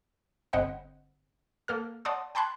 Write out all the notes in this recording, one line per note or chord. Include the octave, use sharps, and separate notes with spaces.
G1 C4 C5 D#5 F#5 B5
A#3 A4 F6
C#5 D5 F#5 A5 C6 D#6
G5 A5 B5 C6 F#6 G#6